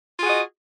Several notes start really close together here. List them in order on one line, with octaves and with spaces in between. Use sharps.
F4 G#4 F#4 D#5